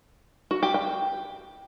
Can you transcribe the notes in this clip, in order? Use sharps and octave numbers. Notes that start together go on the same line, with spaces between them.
F#4
G4
G5